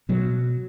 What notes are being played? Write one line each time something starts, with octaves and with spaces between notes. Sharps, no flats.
B2 F#3